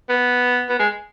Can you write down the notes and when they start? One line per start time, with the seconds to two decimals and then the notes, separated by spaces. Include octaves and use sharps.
0.09 B3
0.70 B3
0.79 G#3